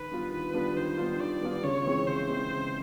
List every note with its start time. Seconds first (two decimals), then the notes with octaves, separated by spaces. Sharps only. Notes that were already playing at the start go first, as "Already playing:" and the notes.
Already playing: D#3 B4
0.11 G3 B3 D4 F4
0.32 D#3 B4
0.54 G3 B3 D4 F4
0.76 D#3 C5
0.97 G3 B3 D4 F4
1.20 D#3 D5
1.41 G3 B3 D4 F4
1.63 C#3 C#5
1.86 E3 G#3 C4
2.07 C#3 C5
2.29 E3 G#3 C4
2.51 C#3